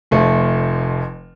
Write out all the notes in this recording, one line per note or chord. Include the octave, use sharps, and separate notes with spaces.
F1 F2 F3 A3